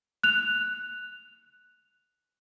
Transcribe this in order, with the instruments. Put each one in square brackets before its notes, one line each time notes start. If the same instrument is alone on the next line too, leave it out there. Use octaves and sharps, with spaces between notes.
[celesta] F#6 F7